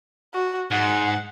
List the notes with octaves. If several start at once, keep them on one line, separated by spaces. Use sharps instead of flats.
F#4
G#2 F#5